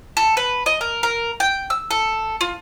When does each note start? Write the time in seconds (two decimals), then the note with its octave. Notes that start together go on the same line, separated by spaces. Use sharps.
0.17 A4
0.37 B4
0.66 D#5
0.81 A#4
1.03 A#4
1.40 G5
1.70 E6
1.91 A4
2.41 F4